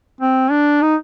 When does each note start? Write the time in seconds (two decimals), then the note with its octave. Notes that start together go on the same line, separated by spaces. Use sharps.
0.21 C4
0.51 D4
0.82 D#4